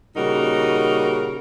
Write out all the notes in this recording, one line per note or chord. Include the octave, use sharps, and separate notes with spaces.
A#2 C#3 G3 D#4 F#4 A#4